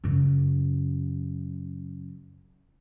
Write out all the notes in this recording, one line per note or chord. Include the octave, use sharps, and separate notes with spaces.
F#2 C#3